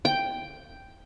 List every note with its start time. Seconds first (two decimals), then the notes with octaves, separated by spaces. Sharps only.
0.05 G5